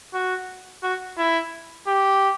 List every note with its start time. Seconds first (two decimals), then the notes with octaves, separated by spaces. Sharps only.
0.14 F#4
0.83 F#4
1.18 E4
1.87 G4